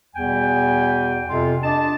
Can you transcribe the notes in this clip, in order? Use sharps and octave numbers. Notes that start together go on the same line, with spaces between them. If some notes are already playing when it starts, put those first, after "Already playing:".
E2 B2 G3 G5 G#5
F2 C3 F4
D4 D#5 A5